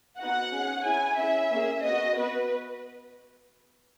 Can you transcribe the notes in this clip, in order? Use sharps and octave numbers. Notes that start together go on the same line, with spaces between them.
B3 D#4 F#4 F#5
C#4 G#4
C#4 E4 G#4 G#5
C#4 E4 G#4 E5
A#3 C#4 G#4
B3 F#4 D#5
B3 F#4 B4